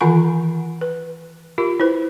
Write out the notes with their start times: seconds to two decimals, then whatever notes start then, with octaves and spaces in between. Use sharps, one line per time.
0.01 D#3 E3 F4 F#5 G#5 C#6
0.81 B4
1.58 F4 G4 A#4
1.80 E4 B4 C5